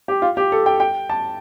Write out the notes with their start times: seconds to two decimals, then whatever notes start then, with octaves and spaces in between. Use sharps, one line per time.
0.08 G4
0.22 F4
0.37 G4
0.52 A4
0.66 G5
0.80 G5
1.10 A5